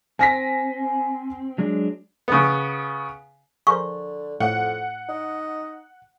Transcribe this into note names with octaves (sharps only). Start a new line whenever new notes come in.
C4 G#5 A#6 B6
F#3 G#3 D4
C#3 B3
D3 G#4 A#4 C5 C#6
F2 A2 F#5
D#4